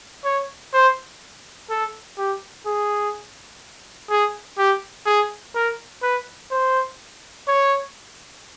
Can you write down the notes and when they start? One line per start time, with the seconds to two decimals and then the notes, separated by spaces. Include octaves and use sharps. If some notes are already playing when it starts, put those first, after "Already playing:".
0.25 C#5
0.73 C5
1.70 A4
2.18 G4
2.66 G#4
4.10 G#4
4.58 G4
5.06 G#4
5.55 A#4
6.02 B4
6.51 C5
7.48 C#5